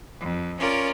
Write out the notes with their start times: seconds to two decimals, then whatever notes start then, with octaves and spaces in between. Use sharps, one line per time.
0.19 F2
0.60 C#4 F4 A#4 D5